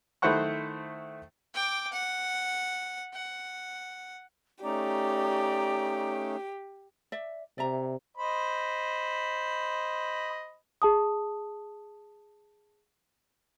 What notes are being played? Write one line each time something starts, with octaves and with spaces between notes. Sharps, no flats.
D#3 A3 E4 C5 F#5 C#6
G5 D6
F#5
F#5
A3 C#4 D#4 G4 D5 A#5 D6
D5 E5
C3 D5 E5 A#5
C5 D#5 B5
G#4 A5 D#6